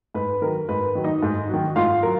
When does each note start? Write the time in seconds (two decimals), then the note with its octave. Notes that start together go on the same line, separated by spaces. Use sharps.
0.14 G#2 B4
0.42 D#3 F#3 A#4
0.69 G#2 B4
0.95 D#3 F#3
1.04 D#4 D#5
1.23 G#2
1.49 D#3 F#3
1.76 G#2 F4 F5
2.03 F#3 A#4